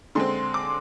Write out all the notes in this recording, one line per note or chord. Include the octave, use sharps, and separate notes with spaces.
D3 G#3 C4 C6
D6